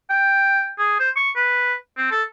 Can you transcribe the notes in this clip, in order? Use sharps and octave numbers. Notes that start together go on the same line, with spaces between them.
G5
G#4
C5
C#6
B4
C4
A4